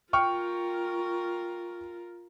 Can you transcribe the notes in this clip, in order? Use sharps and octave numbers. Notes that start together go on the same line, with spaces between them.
F4 A#4 G5 C#6 F6